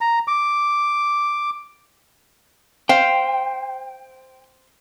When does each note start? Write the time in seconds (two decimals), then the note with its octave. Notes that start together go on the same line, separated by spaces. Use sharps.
0.01 A#5
0.28 D6
2.89 C5 F5 G5